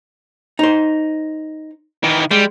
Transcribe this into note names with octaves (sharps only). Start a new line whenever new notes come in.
D#4 C5
D#3 E3
G3 G#3